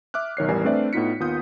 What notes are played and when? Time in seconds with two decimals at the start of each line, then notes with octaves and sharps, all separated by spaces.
0.14 E5 D6 F6 F#6
0.37 B1 D#3 C#5 C7
0.48 A1 E2 G3 A#4 G#5
0.64 A3 C4 D4 B4 D5 E5
0.93 A2 B3 D#4 F4 B6 C#7
1.20 D#2 B3 F4 D#6 G6